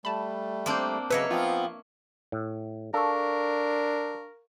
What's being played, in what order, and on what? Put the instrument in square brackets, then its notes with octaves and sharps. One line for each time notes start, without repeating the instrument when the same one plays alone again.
[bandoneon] G3 A3 [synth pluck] A5 B5
[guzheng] A#3 C4 D4 [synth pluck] C6 G6
[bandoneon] C#3 F#3 [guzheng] A#3 C#5 E5 [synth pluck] B4 D#5
[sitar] F3 F4 [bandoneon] B3 C4
[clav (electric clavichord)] A2
[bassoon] D4 [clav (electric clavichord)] A4 [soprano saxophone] A#4 [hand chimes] F5 C#6